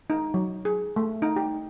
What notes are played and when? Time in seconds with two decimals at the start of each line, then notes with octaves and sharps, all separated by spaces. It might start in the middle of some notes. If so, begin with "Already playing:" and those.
0.10 D#4
0.34 F#3
0.65 G#4
0.96 A3
1.22 D#4
1.36 G4